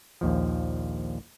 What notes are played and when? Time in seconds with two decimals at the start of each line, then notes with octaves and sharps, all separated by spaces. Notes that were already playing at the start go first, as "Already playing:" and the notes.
0.21 A#1 D#2 F3